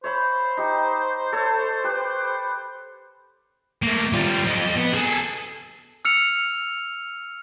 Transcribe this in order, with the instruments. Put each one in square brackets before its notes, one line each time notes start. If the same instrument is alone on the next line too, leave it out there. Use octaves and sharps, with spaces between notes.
[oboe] C5 [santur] C#5 E5 B5
[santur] D#4 G4
A4 C#5 E6
G4 B4
[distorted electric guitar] A3 A#3
G3 F4
F2 D#5
B3
G#4 A4
[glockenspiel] E6 F6 C#7 F7